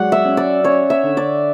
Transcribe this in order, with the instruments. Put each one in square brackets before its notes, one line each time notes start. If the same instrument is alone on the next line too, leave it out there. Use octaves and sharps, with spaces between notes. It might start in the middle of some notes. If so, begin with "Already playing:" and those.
Already playing: [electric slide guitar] F#3 G#3 [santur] D5 F#5
[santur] E5
[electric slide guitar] C#4
[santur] D5
[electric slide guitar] C#4 [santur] C#5
[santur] E5
[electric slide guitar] D3
[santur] D5